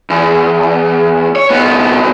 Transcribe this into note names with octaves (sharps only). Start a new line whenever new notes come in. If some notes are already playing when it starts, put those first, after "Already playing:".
E2
C#5
C2 B3